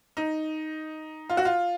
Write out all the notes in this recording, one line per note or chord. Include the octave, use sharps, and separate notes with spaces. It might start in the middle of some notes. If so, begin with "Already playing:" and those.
D#4
F4
F#4
F4